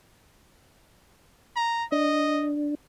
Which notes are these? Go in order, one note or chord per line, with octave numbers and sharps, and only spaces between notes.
A#5
D4 D#5